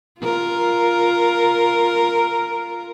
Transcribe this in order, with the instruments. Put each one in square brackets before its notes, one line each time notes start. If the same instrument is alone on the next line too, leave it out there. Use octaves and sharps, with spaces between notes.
[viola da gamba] F4 A#4